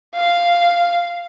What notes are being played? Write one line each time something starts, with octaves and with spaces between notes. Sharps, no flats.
F5